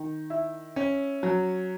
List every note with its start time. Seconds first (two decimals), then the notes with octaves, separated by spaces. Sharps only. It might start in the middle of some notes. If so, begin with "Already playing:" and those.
Already playing: D#3
0.30 E4
0.76 C#4
1.23 F#3